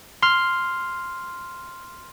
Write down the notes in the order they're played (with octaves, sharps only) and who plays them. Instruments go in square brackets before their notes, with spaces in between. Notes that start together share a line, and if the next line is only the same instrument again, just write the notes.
[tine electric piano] C6 F6